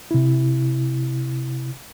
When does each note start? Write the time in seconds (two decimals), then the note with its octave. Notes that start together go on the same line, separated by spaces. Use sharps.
0.11 C3 E4